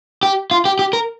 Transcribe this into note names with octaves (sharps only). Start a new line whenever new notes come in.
G4
F4
G4
G4
A#4